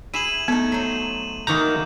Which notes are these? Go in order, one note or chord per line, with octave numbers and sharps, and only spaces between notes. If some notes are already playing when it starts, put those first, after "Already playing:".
E4 G#4 D#7 E7 F#7
A3 B3 D#4
F#3 C5
D#3 E3 A#3 F#4 A#5 G6